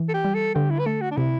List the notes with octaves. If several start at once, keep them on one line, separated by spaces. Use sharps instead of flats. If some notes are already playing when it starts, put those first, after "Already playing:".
Already playing: E3
A4
G4
G3
A4
D3 G4
E4
B4
A3 A4
F#4
D4
C3 E4